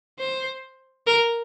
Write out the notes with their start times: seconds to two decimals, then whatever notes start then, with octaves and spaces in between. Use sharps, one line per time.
0.19 C5
1.07 A#4